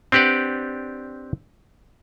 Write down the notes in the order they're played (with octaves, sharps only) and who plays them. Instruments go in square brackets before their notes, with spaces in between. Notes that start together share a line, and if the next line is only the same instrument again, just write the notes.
[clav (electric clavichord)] C4 D4 G4 B4 D5 F#5